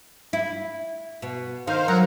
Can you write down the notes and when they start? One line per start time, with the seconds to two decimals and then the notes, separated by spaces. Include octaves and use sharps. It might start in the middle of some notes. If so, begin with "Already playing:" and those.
0.33 E4
1.22 B2
1.68 D#3 C5 F5
1.88 F#3 A#4 F#5 A#5